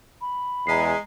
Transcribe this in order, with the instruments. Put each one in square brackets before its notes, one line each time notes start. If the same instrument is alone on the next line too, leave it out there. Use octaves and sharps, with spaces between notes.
[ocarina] B5
[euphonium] E2 [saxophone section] G#3 [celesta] A#5 B6 C7